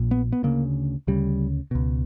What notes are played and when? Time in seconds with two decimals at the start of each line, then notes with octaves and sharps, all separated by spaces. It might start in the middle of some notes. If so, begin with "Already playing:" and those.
Already playing: A#1 A#2
0.11 B3
0.33 B3
0.43 D2 C#3 A#3
1.07 D2 C#3 G3
1.71 C#2 B2